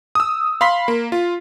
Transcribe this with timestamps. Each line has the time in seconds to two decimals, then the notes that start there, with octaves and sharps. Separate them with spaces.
0.15 D#6 E6
0.61 F5 B5 C6 B6
0.88 A#3
1.12 F4